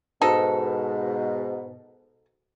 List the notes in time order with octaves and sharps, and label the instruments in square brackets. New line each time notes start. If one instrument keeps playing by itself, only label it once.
[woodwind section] G#2 B2 [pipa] D#4 A4